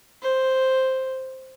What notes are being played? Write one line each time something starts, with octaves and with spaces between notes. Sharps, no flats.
C5